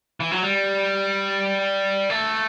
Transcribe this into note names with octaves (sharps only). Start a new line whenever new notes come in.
E3
F#3
G3
A3